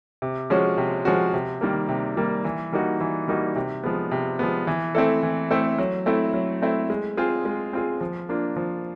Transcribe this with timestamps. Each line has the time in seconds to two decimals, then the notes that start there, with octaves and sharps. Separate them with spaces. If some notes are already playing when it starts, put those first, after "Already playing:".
0.22 C3
0.50 F3 G#3 C#4 F#4
0.78 C3
1.05 F3 G#3 C#4 F#4
1.33 C3
1.61 D#3 G3 A#3
1.89 C3
2.17 D#3 G3 A#3
2.44 E3
2.72 G3 A#3 D#4 F#4
3.00 E3
3.28 G3 A#3 D#4 F#4
3.56 C3
3.84 F3 G#3 B3
4.11 C3
4.39 F3 G#3 B3
4.67 E3
4.95 A3 C4 E4 A4
5.23 E3
5.50 A3 C4 E4 A4
5.78 F#3
6.06 A3 C4 E4
6.34 F#3
6.62 A3 C4 E4
6.90 G#3
7.17 C4 F4 G#4
7.45 G#3
7.73 C4 F4 G#4
8.01 F3
8.29 A#3 D4 F4
8.56 F3